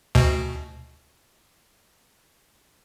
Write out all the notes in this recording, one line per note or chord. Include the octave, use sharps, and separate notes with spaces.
D2 B2